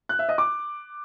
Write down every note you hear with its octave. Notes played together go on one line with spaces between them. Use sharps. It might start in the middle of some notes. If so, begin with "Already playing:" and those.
F#6
E5
D#5
D6